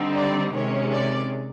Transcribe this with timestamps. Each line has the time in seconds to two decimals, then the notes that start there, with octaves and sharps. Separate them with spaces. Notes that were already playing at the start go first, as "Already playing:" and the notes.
Already playing: D3 G3 C4 D#4
0.16 D5
0.53 C3 D#3 G#3 C#4 C#5
0.91 D5